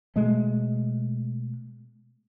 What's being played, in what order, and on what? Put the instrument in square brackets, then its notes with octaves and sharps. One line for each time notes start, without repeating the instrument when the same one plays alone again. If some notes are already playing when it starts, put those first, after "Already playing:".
[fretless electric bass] B2 G#3 A3